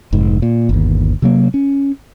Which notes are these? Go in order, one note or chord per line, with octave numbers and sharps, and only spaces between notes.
F1 G#2
A#2
G1 D#2
C3 F#3 A#3
C#4